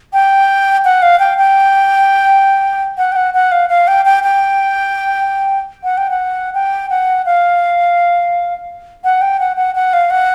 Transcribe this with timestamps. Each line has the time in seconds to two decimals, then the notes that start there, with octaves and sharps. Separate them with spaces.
0.13 G5
0.85 F#5
1.02 F5
1.20 G5
1.38 G5
2.98 F#5
3.12 G5
3.16 F#5
3.34 F#5
3.52 F5
3.69 F5
3.88 G5
4.05 G5
4.23 G5
5.84 F#5
5.98 G5
6.10 F#5
6.54 G5
6.90 F#5
7.26 F5
9.04 F#5
9.21 G5
9.40 F#5
9.57 F#5
9.75 F#5
9.93 F5
10.10 F#5